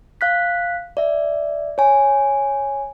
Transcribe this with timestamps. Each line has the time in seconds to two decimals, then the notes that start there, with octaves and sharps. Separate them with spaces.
0.21 F5 F#6 B6
0.97 D5 E5
1.78 C#5 G#5